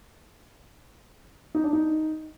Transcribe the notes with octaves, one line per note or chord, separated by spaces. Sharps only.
D#4
D4
D#4